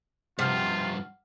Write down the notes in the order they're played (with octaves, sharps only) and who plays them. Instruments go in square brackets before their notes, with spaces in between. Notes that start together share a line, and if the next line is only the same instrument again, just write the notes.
[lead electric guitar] G2 F3 [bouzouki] C3 [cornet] F4 [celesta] F#5 F6 C7